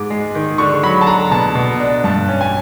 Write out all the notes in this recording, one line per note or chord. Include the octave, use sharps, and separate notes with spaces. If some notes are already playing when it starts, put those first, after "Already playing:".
Already playing: G#2 D6
G#3
D#3
D3 C#6
F#3 B5
A5
D3 A#5
B2 A5
B2
D4
G2 A5
C#4
G#5